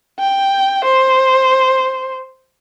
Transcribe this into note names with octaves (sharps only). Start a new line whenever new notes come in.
G5
C5